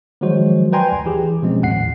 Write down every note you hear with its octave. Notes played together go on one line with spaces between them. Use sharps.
D#3 F3 F#3 G#3 F#4 C5
B4 D5 G5 G#5 A#5 C6
D2
E3 G4 G#4
B2 F3 G#3 C4 C#4
A1 D#2 A2 F#5 C7